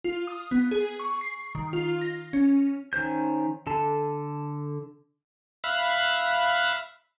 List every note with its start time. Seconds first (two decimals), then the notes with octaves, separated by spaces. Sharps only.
0.04 F4
0.27 D#6
0.51 B3
0.71 G#4
1.00 C#6
1.21 C7
1.55 D#3
1.73 F4
2.01 A#6
2.33 C#4
2.93 D#3 C#4 C5 G6
3.67 D3 A4 A5
5.64 E5 F5 B5 F#6